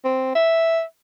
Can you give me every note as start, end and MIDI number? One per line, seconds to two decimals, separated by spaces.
0.05 0.34 60
0.35 0.83 76